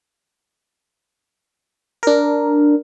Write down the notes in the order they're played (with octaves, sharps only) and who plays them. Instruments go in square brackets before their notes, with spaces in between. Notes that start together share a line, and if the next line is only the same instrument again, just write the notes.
[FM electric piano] D4 A#4